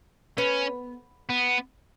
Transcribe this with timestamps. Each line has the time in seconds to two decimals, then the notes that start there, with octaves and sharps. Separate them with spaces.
0.38 B3 C#4
1.29 B3